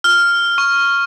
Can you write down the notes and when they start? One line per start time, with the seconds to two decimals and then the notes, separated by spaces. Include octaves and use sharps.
0.04 F6
0.58 C#6